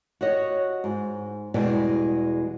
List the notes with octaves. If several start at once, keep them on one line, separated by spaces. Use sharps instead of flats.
F#4 G4 C#5 D#5
G#2
E2 B2 G3 G#3